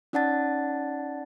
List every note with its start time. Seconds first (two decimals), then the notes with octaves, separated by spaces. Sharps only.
0.13 C#4 D#4 D5 F#5 A5 A6